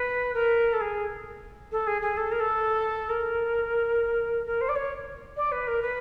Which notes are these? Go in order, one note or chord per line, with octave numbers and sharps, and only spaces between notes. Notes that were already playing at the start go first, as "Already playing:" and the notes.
Already playing: B4
A#4
A4
G#4
A4
G#4
G#4
A4
A#4
A4
A#4
A#4
C5
D5
C#5
D5
B4
A#4
B4